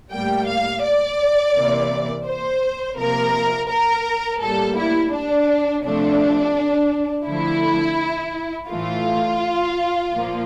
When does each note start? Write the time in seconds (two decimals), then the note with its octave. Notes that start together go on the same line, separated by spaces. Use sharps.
0.12 A2 G3 A#3 G5
0.49 F5
0.84 D5
1.55 C3 E3 A#3
2.27 C5
2.98 C3 F3 A#3 A#4
3.70 A#4
4.41 A2 G3 A#3 A4
4.77 E4
5.13 D4
5.84 C3 F3 A3 D4
7.26 D3 F3 A3 E4
8.69 A2 E3 A3 F4
10.11 A#2 F3 A#3